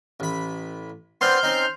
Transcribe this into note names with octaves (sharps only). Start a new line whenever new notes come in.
A1 B5
B3 C4 D4 C6 F6 G6
C4 C#4 D#4